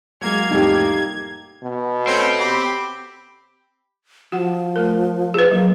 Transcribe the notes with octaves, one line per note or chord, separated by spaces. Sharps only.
F#3 G#3 A#3 G#6
C2 F2 A2 D#4 G4
B2
A3 C4 C#4 C5
G4 B5
F3 F#4 F#5
A3 A#4
G#4 B4
F#3 A#3